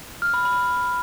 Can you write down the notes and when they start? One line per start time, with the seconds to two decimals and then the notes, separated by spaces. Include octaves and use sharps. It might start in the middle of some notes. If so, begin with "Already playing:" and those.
0.22 F6
0.34 B5
0.45 B5